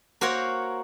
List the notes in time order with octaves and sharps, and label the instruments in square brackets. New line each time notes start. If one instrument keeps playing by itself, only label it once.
[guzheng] A#3 F#4 A#4 C5 C#5